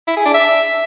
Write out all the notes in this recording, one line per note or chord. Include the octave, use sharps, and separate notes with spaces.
E4
G#4
D4
E5